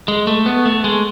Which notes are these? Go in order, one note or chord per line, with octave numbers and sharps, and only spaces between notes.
G#3
A3
B3
A3
G#3